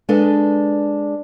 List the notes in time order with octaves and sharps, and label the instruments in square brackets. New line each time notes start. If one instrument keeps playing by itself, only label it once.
[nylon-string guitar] G#3 D4 A4 B4 D#5